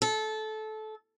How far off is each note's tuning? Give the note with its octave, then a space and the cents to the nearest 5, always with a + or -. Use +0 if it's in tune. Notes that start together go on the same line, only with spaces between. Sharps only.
A4 -20